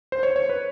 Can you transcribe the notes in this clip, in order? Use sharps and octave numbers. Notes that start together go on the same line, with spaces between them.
C5
C#5
C#5
B4